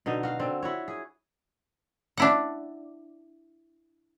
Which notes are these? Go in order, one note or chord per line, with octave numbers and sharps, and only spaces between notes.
B2 D3 D#4 D#5
F#4 F5
D3 C4
E4 F#4 C#5
G#4
D4 E4 F#5